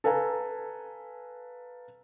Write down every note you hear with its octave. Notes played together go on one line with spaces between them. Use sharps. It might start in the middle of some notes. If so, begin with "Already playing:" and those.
A4 B4 F5 G#5 A#5